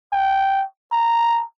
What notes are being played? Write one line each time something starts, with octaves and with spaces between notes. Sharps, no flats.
G5
A#5